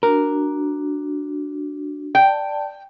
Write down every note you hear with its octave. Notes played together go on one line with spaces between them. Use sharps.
D4 F#4 A#4
D5 G5 A5